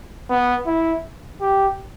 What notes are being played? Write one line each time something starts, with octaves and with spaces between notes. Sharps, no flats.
B3
E4
G4